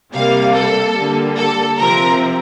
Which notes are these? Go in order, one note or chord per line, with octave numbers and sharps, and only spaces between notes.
C3 G3 A#3 F5
A4
D3 G3 A#3
A4
C3 F3 C4 A#4